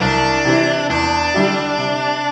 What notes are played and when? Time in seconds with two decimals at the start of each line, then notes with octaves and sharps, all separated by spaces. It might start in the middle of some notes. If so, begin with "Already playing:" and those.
0.01 C2 D4
0.45 C3 E3
0.90 E2 D4
1.34 D3 G3 E4 G4
1.78 C3